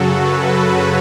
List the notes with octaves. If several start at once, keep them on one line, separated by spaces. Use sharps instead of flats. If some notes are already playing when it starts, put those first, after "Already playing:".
Already playing: F#2 C#3 F#3 F#4 A4
B4
C#5